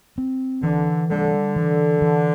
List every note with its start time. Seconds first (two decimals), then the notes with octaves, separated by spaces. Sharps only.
0.18 C4
0.63 D3 E3
1.10 D3 G3
1.56 E3
2.02 E3